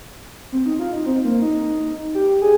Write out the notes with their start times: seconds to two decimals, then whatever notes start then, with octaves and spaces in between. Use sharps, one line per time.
0.52 C4
0.66 D#4
0.79 F4
0.93 D#4
1.06 C4
1.24 A#3
1.42 D#4
2.14 G4
2.41 G#4